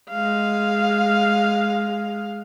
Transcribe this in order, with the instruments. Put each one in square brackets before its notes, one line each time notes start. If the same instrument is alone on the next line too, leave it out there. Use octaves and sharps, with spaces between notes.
[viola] G#3 F5